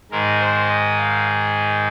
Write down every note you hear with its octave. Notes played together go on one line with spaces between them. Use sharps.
G#2 D#3 G#3 A#4
C5
D#5
F5